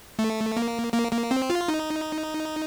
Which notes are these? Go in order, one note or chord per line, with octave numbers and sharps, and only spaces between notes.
A3
A#3
A#3
A#3
C4
F4
D#4